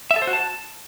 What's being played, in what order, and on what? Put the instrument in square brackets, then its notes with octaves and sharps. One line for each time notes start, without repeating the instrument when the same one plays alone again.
[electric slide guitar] E5
A4
C5
F#4
A5